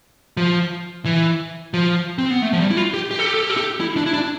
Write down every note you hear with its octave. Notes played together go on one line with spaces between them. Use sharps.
F3
E3
F3
C4
B3
A3
F3
G3
E4
F4
G4
G4
A4
G4
A4
G4
A4
G4
E4
D4
E4
D4